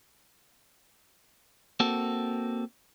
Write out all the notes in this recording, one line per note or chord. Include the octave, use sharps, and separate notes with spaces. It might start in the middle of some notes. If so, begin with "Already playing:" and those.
A#3 C4 F#4 A4